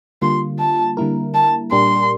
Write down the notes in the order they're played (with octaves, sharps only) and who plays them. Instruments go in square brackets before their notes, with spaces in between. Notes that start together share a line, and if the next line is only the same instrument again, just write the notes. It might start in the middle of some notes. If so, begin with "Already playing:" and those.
[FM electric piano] D3 G3 A#3 F4 [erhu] C6
[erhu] A5
[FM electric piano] D3 G3 A#3 E4 A#4
[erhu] A5
[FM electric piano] A#2 G3 D4 G4 A#4 [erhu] C6